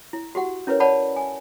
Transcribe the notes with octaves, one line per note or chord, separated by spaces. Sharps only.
E4
F#4 G4 F#5
C#4 E4 A#4 B4 C#5
C#5 D5 F#5 A5 B5
G#5